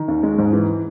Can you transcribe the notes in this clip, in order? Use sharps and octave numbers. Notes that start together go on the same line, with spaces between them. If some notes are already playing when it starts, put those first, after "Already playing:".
Already playing: D#3
D#2
G#3
G#2
E3